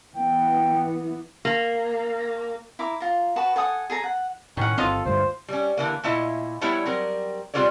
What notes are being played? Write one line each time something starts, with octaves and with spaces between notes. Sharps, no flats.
E3 B3 G5
A#3
E4 A#5 D6
F4 A#5
F#4 B4 A5 D#6
A4 F#5 G#5 D#6
G#4 A4 A#5
F#5
A2 D#3 C#4 F#5
G1 C4 F4 A4 D#5 F5
D2 G2 A3 C5
G3 C#4
D3 E3 A#3
A#2 A3 E4 D#5
G3 A3 B3 E4 C#5
F#3 G3 C4 A#4
G3 C4 F4 A#4 C#5 D5